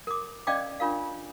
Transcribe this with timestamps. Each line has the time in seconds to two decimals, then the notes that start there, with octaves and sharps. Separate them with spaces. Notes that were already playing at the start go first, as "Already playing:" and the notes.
0.07 A#4 D6
0.47 C#4 D5 D#5 F5 G5 D6
0.80 D4 F4 A#4 F5